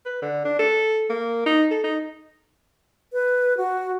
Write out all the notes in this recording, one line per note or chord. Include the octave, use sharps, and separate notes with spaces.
B4
D3
D4
A4
A#3
D#4
A4
D#4
B4
F#4